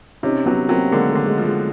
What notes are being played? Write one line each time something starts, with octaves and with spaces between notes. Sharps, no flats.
C3 C#4 D#4
F#3 B3 C#4
F#3 A#3 C4
D3 G#3 A#3
A3
D3
G#3
F3
G#3